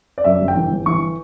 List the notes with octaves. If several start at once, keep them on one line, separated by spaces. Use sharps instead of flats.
D5
F#2 E5
G1
G5
E3
G1
E3 C#6